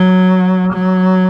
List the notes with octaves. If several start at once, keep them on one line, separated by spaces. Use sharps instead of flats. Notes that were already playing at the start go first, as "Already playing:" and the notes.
Already playing: F#3
F#3